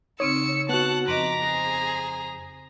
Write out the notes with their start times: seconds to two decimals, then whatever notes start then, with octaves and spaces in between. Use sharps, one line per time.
0.20 C#3 C4 D#4 C#5 E6 C#7
0.69 B3 F#4 F#5 A5 F#6
1.08 F2 C4 D#5 A#5 D6 B6
1.42 G#4 C5 A#6